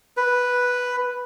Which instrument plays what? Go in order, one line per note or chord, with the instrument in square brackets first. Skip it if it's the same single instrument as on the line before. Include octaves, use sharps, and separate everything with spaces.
[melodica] B4